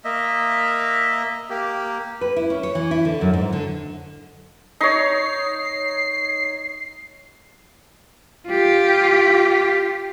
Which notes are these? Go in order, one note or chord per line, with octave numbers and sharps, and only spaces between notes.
A#3 D#5 E5
A#3 G4
B4
E4
C#4
C#5
E3
E4
D3
F#2
G#2
D3
D#4 C#5 C7
F4 G4